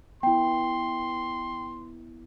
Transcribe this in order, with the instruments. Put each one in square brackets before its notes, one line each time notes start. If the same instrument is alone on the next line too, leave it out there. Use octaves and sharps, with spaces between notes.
[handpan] B3 E4 [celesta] G5 [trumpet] C6